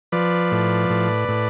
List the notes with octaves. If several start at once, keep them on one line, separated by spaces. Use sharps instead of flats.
F3 B4 D5
A2
A2
A2